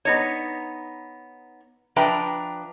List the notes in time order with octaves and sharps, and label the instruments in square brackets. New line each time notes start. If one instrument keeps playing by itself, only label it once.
[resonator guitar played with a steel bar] B3 D#4 C#5
F3 D4 B4 E5 G5 A#5